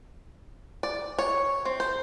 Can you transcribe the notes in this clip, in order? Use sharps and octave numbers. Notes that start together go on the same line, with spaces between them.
D5
C#5
C4
C5